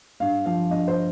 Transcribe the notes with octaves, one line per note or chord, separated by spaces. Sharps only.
G2 F5
F3 F5
G2 D#5
C5